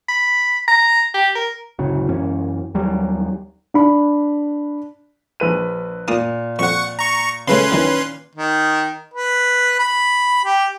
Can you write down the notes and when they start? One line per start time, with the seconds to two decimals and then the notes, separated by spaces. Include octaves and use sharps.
0.08 B5
0.68 A#5
1.14 G4
1.35 A#4
1.79 D1 F#2 C#3 F#3
2.09 F#2 E3 C#4
2.74 D#2 F#3 G3
3.74 D4 B5
5.40 A#1 B4 D#7
6.08 A#2 A#3 D#6
6.59 F2 F#5 C#6
6.99 A#5 C#6
7.48 C#3 F#3 A3 C#4 B4 C6
7.71 D#3 E3 F#3
8.35 D#3
9.14 B4
9.79 B5
10.45 G4